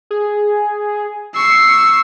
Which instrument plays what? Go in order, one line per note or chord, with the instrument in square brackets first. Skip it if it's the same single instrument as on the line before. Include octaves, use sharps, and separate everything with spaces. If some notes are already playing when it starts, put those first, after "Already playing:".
[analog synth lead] G#4
[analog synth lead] C#6 [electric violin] E6 C7